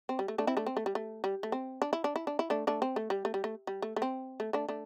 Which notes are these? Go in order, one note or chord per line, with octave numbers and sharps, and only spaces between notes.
C4
G3
A3
A3 D4
C4 E4
A3 D4
C4
A3
G3
A3
G3
A3
C4
D4
E4
D4
E4
D4
E4
A3 D4
A3 D4
C4
A3
G3
A3
G3
A3
G3
A3
A3
C4
A3
A3 D4
A3 D4